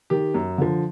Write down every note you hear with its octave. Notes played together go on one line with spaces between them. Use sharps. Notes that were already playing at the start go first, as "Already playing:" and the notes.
D#3 G4
F#2
D3 F3